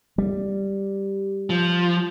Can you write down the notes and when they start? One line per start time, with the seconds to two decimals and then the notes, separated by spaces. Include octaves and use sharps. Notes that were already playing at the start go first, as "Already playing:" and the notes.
0.18 G3
1.50 F3